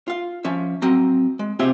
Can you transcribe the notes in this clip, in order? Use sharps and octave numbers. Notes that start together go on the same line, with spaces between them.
F4 F5
F3 C#4 E5
F#3 C4 A#5
G#3
C3 C4 F4 G4 G#4 E5